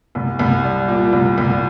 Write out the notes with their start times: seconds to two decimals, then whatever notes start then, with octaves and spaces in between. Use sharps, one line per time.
0.15 C2
0.39 C2
0.64 G3
0.88 A#2
1.13 C2
1.38 C2